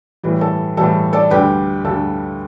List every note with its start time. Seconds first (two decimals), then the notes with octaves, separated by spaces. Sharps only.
0.23 A2 E3 G3
0.41 A4
0.77 A2 E3 G3 A4
1.13 A4 D5
1.30 D2 D3 G3 G4 B4
1.84 D2 D3 G3 A4